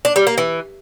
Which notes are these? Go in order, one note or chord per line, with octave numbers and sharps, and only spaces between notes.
D4
G3
A#3
E3